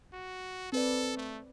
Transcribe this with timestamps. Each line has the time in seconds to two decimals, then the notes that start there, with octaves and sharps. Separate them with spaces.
0.13 F#4
0.72 C4 A4 B4 D5
1.17 A3